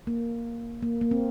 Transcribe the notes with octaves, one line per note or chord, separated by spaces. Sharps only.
A#3
A#3
A#3
C4